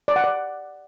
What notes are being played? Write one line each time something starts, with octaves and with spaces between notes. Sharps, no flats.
D5
F#5
D5